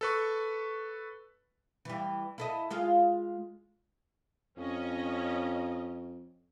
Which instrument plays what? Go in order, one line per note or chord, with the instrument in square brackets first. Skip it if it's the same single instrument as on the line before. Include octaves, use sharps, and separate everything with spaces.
[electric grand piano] A4 B4 C#6
[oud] E3 G3
E4 A4 D#5
G#3 F4 G#4
[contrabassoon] F2 [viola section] C#4 D#5